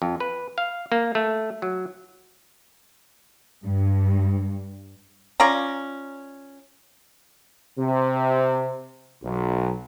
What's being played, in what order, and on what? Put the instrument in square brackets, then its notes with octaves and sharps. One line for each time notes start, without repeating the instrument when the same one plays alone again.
[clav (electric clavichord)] F2
B4
F5
A#3
A3
F#3
[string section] G2
[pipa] C#4 F4 D5 A#5
[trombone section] C3
B1